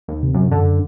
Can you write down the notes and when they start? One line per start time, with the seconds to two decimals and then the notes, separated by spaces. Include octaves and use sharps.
0.08 D#2
0.23 C3
0.34 F#2
0.51 F#2 D3